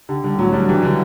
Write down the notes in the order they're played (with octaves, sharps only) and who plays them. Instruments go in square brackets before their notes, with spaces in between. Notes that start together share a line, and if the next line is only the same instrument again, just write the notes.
[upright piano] D3 [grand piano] G4
[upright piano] D3 [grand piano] G3
[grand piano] A2 [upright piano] F#3
[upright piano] G3 [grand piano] D4
[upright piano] E3 [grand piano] G4
[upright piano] D3 [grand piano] G3